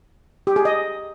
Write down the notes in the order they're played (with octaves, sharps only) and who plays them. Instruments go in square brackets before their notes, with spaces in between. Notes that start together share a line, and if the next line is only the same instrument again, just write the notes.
[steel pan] G4
G#4
D#5